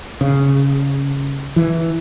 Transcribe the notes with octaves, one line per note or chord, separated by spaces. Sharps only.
C#3
E3